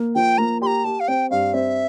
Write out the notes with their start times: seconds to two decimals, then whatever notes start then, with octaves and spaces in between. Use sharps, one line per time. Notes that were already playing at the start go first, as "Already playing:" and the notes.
Already playing: A#3
0.15 F3 G5
0.38 A#3 A#5
0.62 G4 C6
0.67 A#5
0.84 G4 A5
1.00 F5
1.08 C4 G5
1.30 G2 F5
1.54 C4 E5